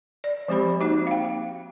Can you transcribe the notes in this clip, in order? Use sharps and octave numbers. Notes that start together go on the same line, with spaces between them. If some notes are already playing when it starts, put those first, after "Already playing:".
D5
F3 G#3 C4 G4 C5 B5
A#3 D#4 F#4
F5 G5